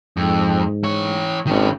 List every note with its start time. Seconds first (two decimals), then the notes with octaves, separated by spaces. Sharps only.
0.17 F2 G#2
0.84 E3 C#5
1.47 G#1 D#3 C#4